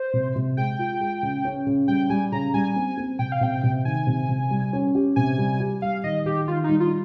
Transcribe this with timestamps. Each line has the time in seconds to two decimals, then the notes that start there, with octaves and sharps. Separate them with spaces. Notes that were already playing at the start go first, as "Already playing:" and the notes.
Already playing: C5
0.13 C3
0.36 C3
0.57 G#3 G5
0.79 F4
1.01 G#3
1.23 C#3
1.45 C#4
1.67 C#3
1.88 G3 G5
2.10 G3 G#5
2.32 C#3 A#5
2.54 G3 G#5
2.76 C4
2.97 C4
3.19 C3 G5
3.32 F5
3.41 C3 G5
3.63 C3
3.85 D#3 G#5
4.07 C3
4.29 C3
4.50 G3
4.73 C#4
4.95 G4
5.16 C3 G#5
5.38 G3
5.60 G4
5.82 G3 F5
6.04 D#3 D#5
6.26 D#3 G4
6.48 D#3 F4
6.64 G3 D#4
6.80 F4